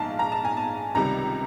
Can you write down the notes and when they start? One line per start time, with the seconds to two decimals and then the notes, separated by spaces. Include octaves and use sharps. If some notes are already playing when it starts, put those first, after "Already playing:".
Already playing: A#1 G#2 G#3 F5 A5
0.19 A#5
0.32 A5
0.45 G#5
0.57 A5
0.95 C#2 C3 D#3 G3 A#5